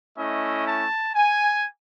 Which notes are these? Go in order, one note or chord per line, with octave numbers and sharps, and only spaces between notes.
A3 C#4 E4 D#5
A5
G#5